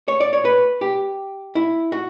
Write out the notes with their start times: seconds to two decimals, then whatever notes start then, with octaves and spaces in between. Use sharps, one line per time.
0.08 C#5
0.20 D5
0.33 C#5
0.45 B4
0.81 G4
1.55 E4
1.92 F#4